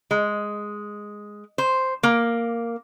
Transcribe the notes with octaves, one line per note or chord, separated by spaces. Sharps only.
G#3
C5
A#3